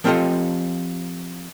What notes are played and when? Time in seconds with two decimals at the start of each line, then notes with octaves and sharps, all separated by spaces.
0.04 F3 C4 F4 G4 A4 D#5